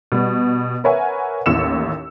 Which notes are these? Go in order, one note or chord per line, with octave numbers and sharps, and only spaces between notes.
B2 G3 B3
A#4 B4 C#5 E5 F#5 G#5
A1 D#2 E4 E6 C#7 E7